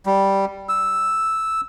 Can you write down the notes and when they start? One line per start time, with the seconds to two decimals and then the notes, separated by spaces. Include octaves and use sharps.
0.06 G3
0.69 E6